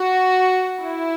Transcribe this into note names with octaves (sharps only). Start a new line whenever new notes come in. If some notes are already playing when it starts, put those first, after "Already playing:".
Already playing: F#4
E4